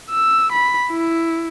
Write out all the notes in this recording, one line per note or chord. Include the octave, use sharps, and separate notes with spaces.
E6
B5
E4